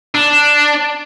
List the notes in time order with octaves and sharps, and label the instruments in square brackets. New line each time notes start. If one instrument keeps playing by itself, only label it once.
[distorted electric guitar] D4